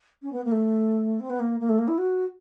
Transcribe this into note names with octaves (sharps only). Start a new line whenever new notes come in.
C#4
B3
A#3
A3
C4
B3
A#3
A#3
A3
A#3
E4
F#4